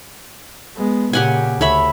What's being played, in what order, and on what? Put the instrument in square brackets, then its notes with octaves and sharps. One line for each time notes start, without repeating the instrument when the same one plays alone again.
[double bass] G#3 B3
[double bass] A#2 C#3 [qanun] G4 F#5 G#5
[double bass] D2 [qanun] C#5 E5 B5